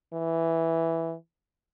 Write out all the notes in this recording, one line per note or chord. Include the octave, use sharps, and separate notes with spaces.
E3